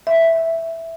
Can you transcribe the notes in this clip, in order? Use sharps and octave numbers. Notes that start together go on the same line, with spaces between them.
E5